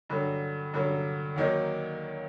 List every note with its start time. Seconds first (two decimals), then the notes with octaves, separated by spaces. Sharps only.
0.10 G2 D3 F#3
0.74 G2 D3 F#3
1.36 D#2 D#3 F#3 A#3 D#4